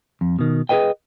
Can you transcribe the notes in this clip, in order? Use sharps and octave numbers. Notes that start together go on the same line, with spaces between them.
F2
B2 D#3
G#4 A4 B4 D#5 G5